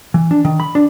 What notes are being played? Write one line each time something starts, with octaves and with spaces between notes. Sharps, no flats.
E3
D4
D#3
B5
D4